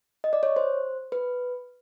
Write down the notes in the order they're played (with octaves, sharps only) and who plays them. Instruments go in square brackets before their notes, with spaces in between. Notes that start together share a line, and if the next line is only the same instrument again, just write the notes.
[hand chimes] D#5
D5
C#5
C5
B4